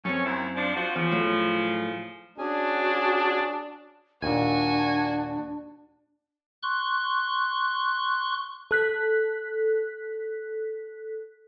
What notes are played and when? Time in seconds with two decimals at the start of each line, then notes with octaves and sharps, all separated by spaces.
0.05 F#2 C4 C#4 A4 C#5
0.25 D#2 E4
0.56 F3 D4
0.76 F3 F#4
0.96 E2 C#3 F3
1.11 A2 F#3 A3
2.38 C#4 D4 F#4 G#4 G#5
4.23 D#2 A#2 D4 F#4 G#5
6.63 C6 C#6 F#6
8.71 A4 F#6 B6